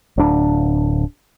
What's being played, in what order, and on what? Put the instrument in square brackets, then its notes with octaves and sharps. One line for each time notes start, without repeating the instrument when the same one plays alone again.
[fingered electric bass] D1 D4